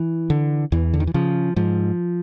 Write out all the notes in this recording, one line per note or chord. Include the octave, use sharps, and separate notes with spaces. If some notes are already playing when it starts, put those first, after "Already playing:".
Already playing: E3
D3
E2 E3
D3
D#3
E3
C#3 F3
G#2 F3